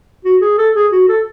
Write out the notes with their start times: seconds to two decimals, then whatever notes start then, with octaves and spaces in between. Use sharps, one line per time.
0.25 F#4
0.41 G#4
0.58 A4
0.75 G#4
0.92 F#4
1.09 A4